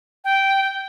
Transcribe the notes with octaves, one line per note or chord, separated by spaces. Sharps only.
G5